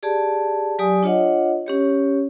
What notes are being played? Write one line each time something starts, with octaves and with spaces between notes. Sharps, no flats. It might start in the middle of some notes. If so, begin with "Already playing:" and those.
G4 G#4 D5 A5
F#3 G4 D5 G#5 D#6
D4 F4 C#5 D#5 F#5
C#4 G4 C#5